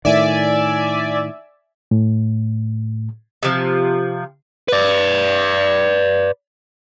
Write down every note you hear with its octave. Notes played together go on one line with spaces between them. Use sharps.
A2 D#3 D5 E5 G#5
A2
C3 F3
B4 D5